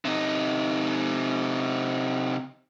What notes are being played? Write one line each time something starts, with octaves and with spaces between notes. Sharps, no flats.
C3 D#4